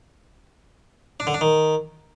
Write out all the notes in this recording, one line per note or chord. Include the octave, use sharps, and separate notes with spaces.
D4
D3
D4
D#3